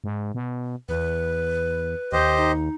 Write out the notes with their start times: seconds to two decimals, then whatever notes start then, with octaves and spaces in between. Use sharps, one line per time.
0.04 G#2
0.35 B2
0.89 E2 B4
2.12 D#2 G4 C5 D#5
2.37 D#4